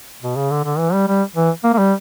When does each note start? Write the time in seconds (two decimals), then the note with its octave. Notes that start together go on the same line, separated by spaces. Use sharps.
0.22 B2
0.36 C#3
0.51 D3
0.65 D3
0.78 E3
0.93 G3
1.08 G3
1.35 E3
1.64 A#3
1.74 A#3
1.78 G3